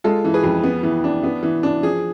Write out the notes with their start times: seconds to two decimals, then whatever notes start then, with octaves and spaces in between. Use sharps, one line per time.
0.04 G#3 F4 A4
0.24 E3
0.34 G#4 B4
0.44 F2
0.63 B3
0.83 E3
1.04 D4
1.23 B3
1.43 E3
1.63 D4
1.83 F3 G#4